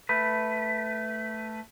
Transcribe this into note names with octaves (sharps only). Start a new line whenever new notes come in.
A3 B4